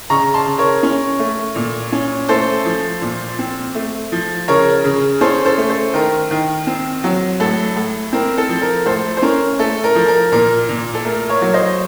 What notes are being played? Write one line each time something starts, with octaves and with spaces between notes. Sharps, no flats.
C#3 A#5 C#6
A5 C6
C#3
A#4 C#5
C#4
A3
A#2
C#4
A3 A4 C5
F3
A#2
C4
A3
F3
C#3 A#4 C#5
C#3
C#4 A4 C5
A4 C5
A3
A4 C5
D#3 A#4
D#3
C4
F#3
A2 A4
A2
C4 A#4
A4
F3
A#4
A2 A4 C5
C5
C#4 A#4
A3 A4
A#4
F3
A#4
A#2 A#4
A#2
A4
A3 A#4
A#4 C#5
F#3
C5 D#5